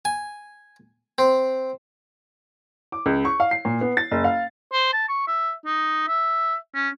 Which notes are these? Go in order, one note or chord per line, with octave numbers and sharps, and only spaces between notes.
G#5
C4
D6
C#2
C#6
F5
C7
A#2
B3
A6
F#1
F5
C5
A5
C#6
E5
D#4
E5
C#4